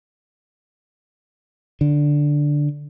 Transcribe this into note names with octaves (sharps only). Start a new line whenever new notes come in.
D3